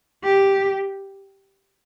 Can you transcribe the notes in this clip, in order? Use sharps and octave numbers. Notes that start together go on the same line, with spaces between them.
G4